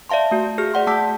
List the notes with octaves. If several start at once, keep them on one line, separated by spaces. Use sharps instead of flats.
D5 E5 F5 A5 C6
A3 F#4
F#4 G#4 F6
D5 F#5 C6
A3 A5 D6 E6 G6 B6